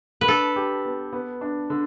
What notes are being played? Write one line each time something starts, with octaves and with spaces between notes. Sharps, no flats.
B4
D4 A4
G4
B3
B3
D4
D3